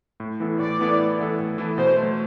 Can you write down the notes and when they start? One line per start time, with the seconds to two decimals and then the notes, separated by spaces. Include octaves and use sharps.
0.20 A2
0.40 E3 B3 E4 A4
0.59 A2 D5
0.79 E3 B3 E4 A4
0.99 A2
1.19 E3 B3 E4 A4
1.39 A2
1.58 E3 B3 E4 A4
1.77 B2 C5
1.97 A3
2.02 F#3